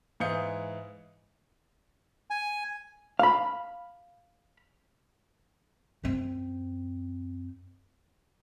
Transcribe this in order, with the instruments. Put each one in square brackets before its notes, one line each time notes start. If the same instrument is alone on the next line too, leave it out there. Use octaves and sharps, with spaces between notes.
[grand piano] G#2 E3 F5 D#6 G6 C#7
[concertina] G#5
[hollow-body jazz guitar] F5 B5
[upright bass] F#2 C4